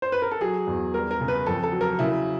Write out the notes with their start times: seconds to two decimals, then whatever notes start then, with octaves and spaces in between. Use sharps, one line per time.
0.02 C5
0.12 B4
0.22 A#4
0.31 A4
0.41 F#3 G#4
0.67 E2
0.94 G3 A#4
1.11 A#4
1.20 C#3
1.28 B4
1.46 F2 A4
1.63 A4
1.72 F#3
1.81 A#4
1.99 C#3 E4